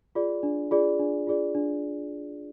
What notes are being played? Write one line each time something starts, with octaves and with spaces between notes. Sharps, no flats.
F4 G#4 D5
D4
F4 G#4 D5
D4
F4 G#4 D5
D4